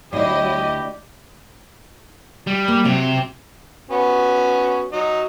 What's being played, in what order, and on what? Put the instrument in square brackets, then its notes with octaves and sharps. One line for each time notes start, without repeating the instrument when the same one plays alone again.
[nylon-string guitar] D2 G2 [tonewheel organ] F#3 [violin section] E4 D#5 [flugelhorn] G4
[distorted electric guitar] G3
[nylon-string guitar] A#3
[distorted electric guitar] C3 G4 [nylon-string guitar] F#3
[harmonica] B3 C#4 F#4
F#3 D#4